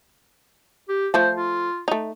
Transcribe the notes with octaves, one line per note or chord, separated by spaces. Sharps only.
G4
F3 A3 A4 C5
F4
A3 D#4